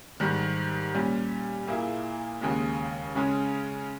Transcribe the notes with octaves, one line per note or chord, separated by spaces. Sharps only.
G#2 D#3 G3
A#2 G3 C#4
A#2 A#3 E4 G#4
D#2 C#3 G#3
C#3 G#3 C#4